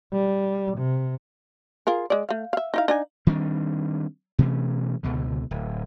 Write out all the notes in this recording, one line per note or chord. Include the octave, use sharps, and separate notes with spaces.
G3
C3
F4 G#4 A#4
G#3 D5
A3 F5
E5 F5
D#4 E4 F5
D4 D#4 G#5
D#3 G3 C4 D4
B2 E3 A3 C#4
C#2 B2 D3
D1